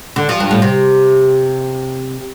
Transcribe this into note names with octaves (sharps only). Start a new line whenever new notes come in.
D3
F3
G2
A2
C3